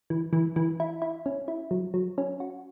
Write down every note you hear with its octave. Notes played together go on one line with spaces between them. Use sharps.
E3
E3
E3
E4
E4
C#4
E4
F#3
F#3
C#4
F#4